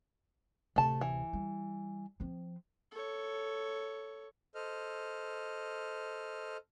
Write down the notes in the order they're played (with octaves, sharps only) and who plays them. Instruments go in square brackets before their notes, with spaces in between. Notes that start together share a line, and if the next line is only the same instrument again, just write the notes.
[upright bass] D1 C3 [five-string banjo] A3 A5
[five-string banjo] E3
[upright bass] G3
F3 C4
[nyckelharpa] A4 C#5
[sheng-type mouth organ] A4 C5 D#5 F6